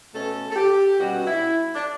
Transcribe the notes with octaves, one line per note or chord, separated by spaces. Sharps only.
B2 A3 C#4 A4
A4
G4
B2 G3 C#4 F#4
E4
D4